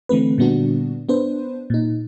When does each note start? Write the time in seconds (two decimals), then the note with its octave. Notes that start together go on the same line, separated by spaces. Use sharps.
0.09 D3 E3 A3 C4 B4
0.38 A#2 D3 G3 B3 D4 F#4
1.09 B3 D4 B4 C5
1.70 A#2 D#4